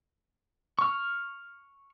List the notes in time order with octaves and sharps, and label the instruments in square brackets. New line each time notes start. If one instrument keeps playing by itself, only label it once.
[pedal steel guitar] C#6 F6